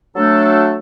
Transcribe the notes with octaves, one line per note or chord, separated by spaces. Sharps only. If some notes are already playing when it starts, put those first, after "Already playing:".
F#3 A3 D4 A4